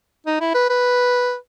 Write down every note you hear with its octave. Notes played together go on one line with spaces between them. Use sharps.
D#4
E4
B4
B4